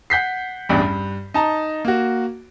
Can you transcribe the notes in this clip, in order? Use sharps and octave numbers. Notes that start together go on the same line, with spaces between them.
F#5 G6 B6 C7
A1 E2 G2 D4
G2
D#4 A5 A#5
A#3 F#4